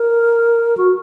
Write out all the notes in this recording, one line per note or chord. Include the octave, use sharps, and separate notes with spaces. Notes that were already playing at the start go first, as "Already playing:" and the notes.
Already playing: A#4
F#4